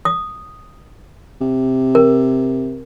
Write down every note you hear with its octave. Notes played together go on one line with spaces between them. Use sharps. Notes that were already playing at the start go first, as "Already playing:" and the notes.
D#6
C3
A#4